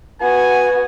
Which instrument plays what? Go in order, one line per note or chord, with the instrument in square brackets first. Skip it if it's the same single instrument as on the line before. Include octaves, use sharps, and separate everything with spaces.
[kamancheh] B3 F#4 [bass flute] B4 [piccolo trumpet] G#5